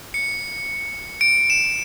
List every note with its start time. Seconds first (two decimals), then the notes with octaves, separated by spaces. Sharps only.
0.14 C#7
1.21 D7
1.50 E7